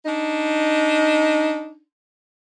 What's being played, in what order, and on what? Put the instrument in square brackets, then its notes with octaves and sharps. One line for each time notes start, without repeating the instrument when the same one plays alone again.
[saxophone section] D4 D#4